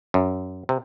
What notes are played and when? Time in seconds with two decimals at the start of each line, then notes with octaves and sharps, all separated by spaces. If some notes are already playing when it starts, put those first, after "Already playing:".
0.14 F#2
0.69 C3